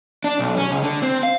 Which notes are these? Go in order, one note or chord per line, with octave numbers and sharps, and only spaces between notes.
D4
B1
C#4
C#2
D3
C4
F5